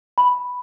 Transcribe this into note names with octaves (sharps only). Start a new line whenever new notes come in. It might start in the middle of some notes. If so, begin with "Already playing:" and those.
B5